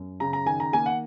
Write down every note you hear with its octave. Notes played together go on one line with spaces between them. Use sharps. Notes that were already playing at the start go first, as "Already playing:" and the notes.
Already playing: F#2
C#3 A#5
A#5
D#3 G#5
A#5
A#3 G#5
F#5